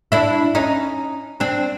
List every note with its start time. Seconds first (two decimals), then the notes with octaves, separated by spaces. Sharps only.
0.12 D4 E4
0.55 C#4 D#4
1.40 C4 D4